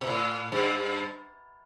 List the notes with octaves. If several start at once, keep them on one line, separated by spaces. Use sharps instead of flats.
B2
A2
G2